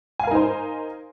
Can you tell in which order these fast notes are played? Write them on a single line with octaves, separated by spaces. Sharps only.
G#5 F5 A#4 D#4 C5